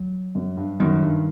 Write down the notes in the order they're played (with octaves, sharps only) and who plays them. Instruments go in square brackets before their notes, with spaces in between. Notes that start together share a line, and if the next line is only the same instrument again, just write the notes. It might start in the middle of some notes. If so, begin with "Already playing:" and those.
Already playing: [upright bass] F#3
[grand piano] F#2
G2
[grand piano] F#2 [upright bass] D#3
[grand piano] G2